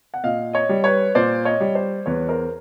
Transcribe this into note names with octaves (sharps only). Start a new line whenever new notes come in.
F#5
A#2 D#5 F5
C#5 D#5
G3
B4 C#5
A#2 C5 D5
C#5 D#5
G3
C5 D5
E2 B4 C#5
A#4 C5